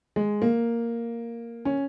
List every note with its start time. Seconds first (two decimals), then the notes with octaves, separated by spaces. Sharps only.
0.16 G#3
0.42 A#3
1.65 C#4